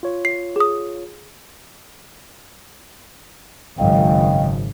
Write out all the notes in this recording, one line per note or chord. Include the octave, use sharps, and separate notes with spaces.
F4 C#5
C7
G#4 D#6
G#1 F#2 C#3 D#5 F5 G5